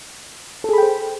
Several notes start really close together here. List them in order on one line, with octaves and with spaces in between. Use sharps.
A4 G#4 B5 G5 C5